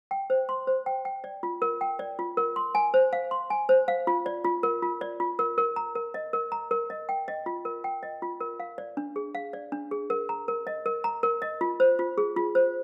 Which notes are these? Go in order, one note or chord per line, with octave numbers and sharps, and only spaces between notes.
G5
C5
C6
C5
G5
G5
D5
F4
A#4
G5
D5
F4
A#4
C6
G#5
C5
F5
C6
G#5
C5
F5
F4
D5
F4
A#4
F4
D5
F4
A#4
A#4
A#5
A#4
D#5
A#4
A#5
A#4
D#5
G5
D#5
F4
A#4
G5
D#5
F4
A#4
F5
D5
D4
G#4
F5
D5
D4
G#4
A#4
A#5
A#4
D#5
A#4
A#5
A#4
D#5
F4
C5
F4
G#4
F4
C5